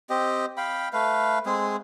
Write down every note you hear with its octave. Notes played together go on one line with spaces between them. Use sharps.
C4 G4 D#5
F5 G5 B5
A3 B4 F5
G#3 C4 G#4